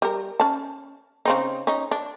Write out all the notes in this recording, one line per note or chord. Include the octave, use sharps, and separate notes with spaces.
G3 A#4
C#4 A5
C#3 C4 D#4
C#4 D#4
D4